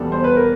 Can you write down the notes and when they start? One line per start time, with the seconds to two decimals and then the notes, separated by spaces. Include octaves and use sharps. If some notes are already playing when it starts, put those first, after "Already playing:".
Already playing: E2 B2 G3 A4
0.12 C5
0.24 B4
0.36 A#4